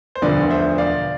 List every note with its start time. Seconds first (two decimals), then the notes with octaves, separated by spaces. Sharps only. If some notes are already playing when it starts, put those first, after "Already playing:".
0.15 C5
0.22 E1 D2 D3 F3 B3 B4 D5
0.50 C5 E5
0.78 D5 F5